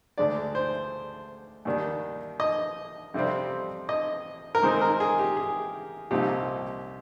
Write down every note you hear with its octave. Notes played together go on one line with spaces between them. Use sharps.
D2 D3 G#3 D4 D5
C5
D#2 D#3 G3 D4
D#5
F2 C3 G3 C4
D#5
A#4
G#2 D#3 G#3 C4 D#4 C5
A#4
G#4
G4
G#4
C2 A#2 F3 C4 D#4 G4